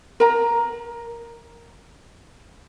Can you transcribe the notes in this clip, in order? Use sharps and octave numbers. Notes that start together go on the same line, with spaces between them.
A#4 A#5